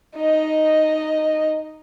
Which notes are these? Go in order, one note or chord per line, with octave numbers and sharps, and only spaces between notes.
D#4 D#5